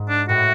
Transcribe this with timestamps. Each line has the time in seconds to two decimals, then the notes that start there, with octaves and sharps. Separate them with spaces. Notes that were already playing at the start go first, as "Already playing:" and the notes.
Already playing: G#2
0.09 D4
0.28 A2 F#4